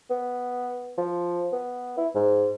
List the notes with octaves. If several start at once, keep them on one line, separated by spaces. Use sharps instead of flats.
B3
F3
B3
E4
G#2